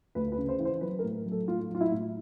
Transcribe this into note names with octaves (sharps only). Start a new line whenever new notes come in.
D2 B4
B4
C#3
C5
E3
C5
F#3 B4
A#4
A2
F#3
A4
A2 F4
F#3 F4
E4
A2